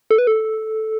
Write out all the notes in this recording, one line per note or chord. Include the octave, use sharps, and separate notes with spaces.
A4
B4
A4